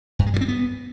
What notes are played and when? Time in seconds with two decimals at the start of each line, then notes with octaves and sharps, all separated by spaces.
0.19 G2
0.26 G#3
0.34 G3
0.41 C4
0.48 B3